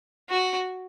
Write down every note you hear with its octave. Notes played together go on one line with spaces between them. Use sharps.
F#4